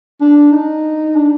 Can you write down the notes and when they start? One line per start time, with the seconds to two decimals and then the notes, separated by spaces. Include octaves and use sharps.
0.21 D4
0.52 D#4
1.16 D4